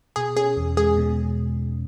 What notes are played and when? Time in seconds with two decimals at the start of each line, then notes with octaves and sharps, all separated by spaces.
0.16 B2 G#4
0.37 C#4 G#4
0.57 E2
0.77 G#3 G#4
0.97 B2